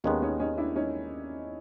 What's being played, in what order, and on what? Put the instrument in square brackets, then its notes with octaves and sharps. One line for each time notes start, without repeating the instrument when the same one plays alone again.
[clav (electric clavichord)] D#2 D#3 G#3 B3 [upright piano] C#4 D#4
[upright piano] C#4 D#4
C#4 D#4
D4 E4
C#4 D#4